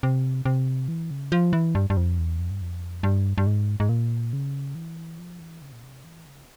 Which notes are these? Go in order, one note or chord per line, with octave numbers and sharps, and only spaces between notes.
C3
C3
E3
C#3
F3
E3
G2
G2
F2
E2
F2
G2
F2
G2
G2
G#2
G#2
A#2
C#3
E3
F3
E3
C#3
A#2
C3
E3
C#3